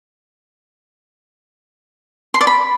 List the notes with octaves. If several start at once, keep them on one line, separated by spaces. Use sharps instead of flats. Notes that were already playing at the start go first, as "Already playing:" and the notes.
C6
D5
B5